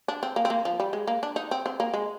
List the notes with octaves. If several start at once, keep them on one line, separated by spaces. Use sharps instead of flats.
D4
C4
A#3
C4
A#3
F3
G3
G#3
A#3
D4
D#4
C4
C4
A#3
G#3